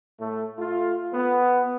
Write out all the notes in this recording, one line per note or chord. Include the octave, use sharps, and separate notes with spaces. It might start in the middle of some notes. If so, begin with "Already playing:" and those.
A2 A3
A3 F4
B3